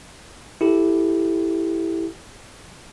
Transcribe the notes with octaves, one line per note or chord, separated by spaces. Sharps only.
E4 G4 A4